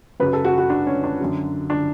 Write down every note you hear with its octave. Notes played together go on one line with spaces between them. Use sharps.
F#2 C#3 F#3 B4
A4
F#4
F#4
D4
C#4
D4
F#2 D3 F#3
D4